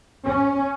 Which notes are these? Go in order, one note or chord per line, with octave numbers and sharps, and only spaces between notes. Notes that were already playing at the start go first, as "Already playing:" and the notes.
C#4